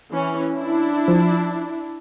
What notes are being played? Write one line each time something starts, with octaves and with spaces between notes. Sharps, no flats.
E3 C#4
D4 E4
F3